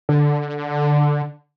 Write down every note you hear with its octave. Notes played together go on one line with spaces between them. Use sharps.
D3